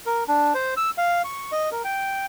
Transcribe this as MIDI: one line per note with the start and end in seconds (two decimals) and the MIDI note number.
0.06 0.24 70
0.28 0.53 62
0.54 0.74 72
0.77 0.90 88
0.98 1.22 77
1.24 1.51 85
1.52 1.70 75
1.72 1.83 70
1.84 2.26 79